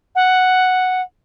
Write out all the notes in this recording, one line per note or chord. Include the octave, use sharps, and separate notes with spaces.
F#5